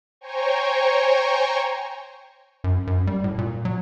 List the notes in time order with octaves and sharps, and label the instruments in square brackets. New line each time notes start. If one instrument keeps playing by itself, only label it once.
[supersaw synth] C5 C#5 G5 G#5 A#5 C#6
[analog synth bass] F#2
F#2
G3
A2
A#2
F#3